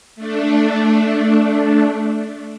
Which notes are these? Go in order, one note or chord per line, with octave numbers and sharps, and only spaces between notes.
A3 D4